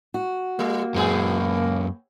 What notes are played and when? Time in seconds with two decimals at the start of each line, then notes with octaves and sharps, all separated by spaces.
0.14 F#4
0.59 G3 A#3
0.94 F#2 A2 G#3 B3 G#4